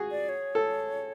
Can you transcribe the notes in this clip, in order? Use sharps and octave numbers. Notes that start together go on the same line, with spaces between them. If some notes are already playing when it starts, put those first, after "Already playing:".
Already playing: F#4 G#4
D5
C#5
A4